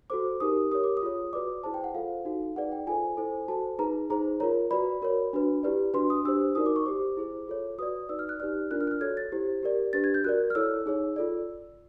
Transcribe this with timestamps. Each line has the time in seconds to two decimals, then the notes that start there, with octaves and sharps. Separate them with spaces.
0.10 F#4 A4 C5 D6
0.40 D#4 G4 A#4 D#6
0.71 G4 A#4 C#5 D#6
0.84 D6
0.97 D#6
1.02 F4 G#4 C#5
1.33 F#4 B4 D5 D6
1.64 E4 G#4 C5 A5
1.74 G5
1.84 F#5
1.95 F4 A4 C5 F5
2.25 D#4 F#4 A4
2.56 D#4 G#4 B4 D5 F#5
2.72 G5
2.87 F4 A4 C5 G#5
3.17 E4 A4 C5
3.48 F#4 A4 C5 A5
3.79 D#4 G#4 B4 A#5
4.10 D#4 G#4 C5 A#5
4.40 F4 A#4 C#5 A#5
4.71 F#4 B4 D5 B5
5.02 F#4 A#4 C#5
5.33 D4 F#4 B4
5.63 E4 G4 B4 D5
5.94 D4 F#4 B4 C6
6.10 D#6
6.25 D4 G4 C5 E6
6.55 D#4 F#4 A#4 D5 D#6
6.66 D6
6.76 C#6
6.86 G4 C5 D6
7.17 E4 G#4 C5
7.48 F4 A4 C#5
7.78 F#4 B4 D5 D#6
8.09 D#4 F#4 B4 D5 E6
8.19 F6
8.29 F#6
8.40 D#4 G4 B4 D5 F6
8.71 D4 F4 A#4 D5 F#6
8.81 F6
8.87 F#6
8.91 F6
9.01 F#4 A4 C#5 G#6
9.17 A6
9.32 E4 G4 C5
9.63 G4 A#4 D5
9.93 D4 G4 B4 A6
10.04 G#6
10.14 G6
10.24 F#4 A#4 D5 F#6
10.50 F6
10.55 E4 A4 C#5 E6
10.86 D#4 G#4 C#5
11.16 F4 A4 D5